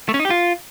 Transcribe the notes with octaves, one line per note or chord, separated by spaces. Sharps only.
A3
C#4
D#4
G4
F4